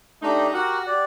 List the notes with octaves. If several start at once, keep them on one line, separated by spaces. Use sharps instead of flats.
A3 D4 D#4 G4
F#4 G4 A#4 F#5
G4 D5 F#5